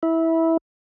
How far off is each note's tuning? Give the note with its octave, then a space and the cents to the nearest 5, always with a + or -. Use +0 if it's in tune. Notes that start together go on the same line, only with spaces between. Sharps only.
E4 -15